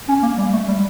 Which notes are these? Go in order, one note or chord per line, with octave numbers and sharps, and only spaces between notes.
C#4
A#3
G3
A3
G3